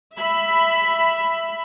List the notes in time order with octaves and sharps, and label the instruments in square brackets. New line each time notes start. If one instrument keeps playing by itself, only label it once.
[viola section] E5 B5